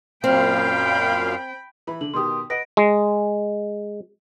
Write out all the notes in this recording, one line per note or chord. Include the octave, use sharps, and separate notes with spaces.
F#2 A#2 C4 F5 G5 B5
E3 B5
D3 F#7
B2 D#3 G4 C6 D#6
B4 D#5 F#5 A#6 D7
G#3